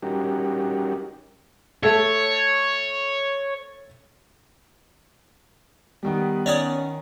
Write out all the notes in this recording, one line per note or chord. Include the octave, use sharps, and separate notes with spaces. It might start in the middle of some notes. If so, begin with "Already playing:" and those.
G3 C#4 D#4 F#4 G4 A#4
A3 A4 C#5
D#3 G3 B3
D#3 C#4 C#5 D5 D#6